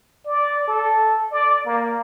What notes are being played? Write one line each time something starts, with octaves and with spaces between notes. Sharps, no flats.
D5
A4
D5
A#3